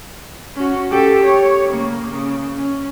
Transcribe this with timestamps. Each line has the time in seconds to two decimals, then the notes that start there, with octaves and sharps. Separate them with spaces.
0.56 C#4 F#4
0.91 G4 A4
1.25 C#5
1.69 C#3 A#3
2.11 C#3
2.56 C#4